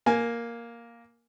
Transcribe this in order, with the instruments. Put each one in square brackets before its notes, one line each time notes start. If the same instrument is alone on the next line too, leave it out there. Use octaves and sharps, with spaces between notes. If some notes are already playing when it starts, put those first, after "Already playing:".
[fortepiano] A#3 G#5